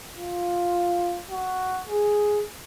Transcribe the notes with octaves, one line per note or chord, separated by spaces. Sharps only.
F4
F#4
G#4